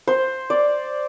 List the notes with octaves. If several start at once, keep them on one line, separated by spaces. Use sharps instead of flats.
C5
D5